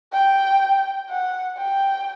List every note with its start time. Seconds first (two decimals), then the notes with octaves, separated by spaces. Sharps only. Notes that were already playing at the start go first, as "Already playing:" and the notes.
0.13 G5
1.09 F#5
1.58 G5